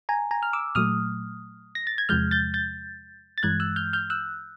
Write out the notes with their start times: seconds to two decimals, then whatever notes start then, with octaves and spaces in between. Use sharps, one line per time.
0.09 G#5 A#5
0.31 G#5 A#5
0.43 F6
0.53 D6 E6
0.75 A#2 F#3 A3 D#6 F6
1.75 A#6
1.87 A6
1.98 G#6
2.09 E2 C3 F3 G#3 F6 G6
2.31 G6 A6
2.54 G6 A6
3.38 A6
3.43 G2 E3 G#3 F#6 G#6
3.60 E6 F#6
3.76 F6 G6
3.93 F6 G6
4.10 E6 F#6